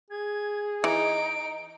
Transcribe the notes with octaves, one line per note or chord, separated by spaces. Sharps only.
G#4 G#6
E3 D#4 D7